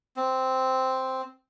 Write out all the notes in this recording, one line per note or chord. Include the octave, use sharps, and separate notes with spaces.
C4